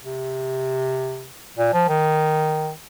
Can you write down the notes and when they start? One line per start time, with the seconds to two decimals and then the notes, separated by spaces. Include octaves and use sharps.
0.04 C3
1.57 A#2
1.73 F3
1.89 D#3